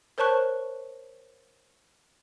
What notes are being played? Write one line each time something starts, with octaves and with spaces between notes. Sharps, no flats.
A#4 C5 C#5 A5 C#6 F#6